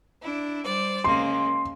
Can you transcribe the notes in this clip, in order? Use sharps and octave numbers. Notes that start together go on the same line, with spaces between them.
D4 E4
G3 C5 D5
C#3 G#3 A#3 C6